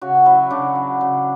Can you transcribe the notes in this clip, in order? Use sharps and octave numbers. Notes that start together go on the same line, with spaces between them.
C#3 F#4
F#3 E4
C#3 D4
F#3
C#3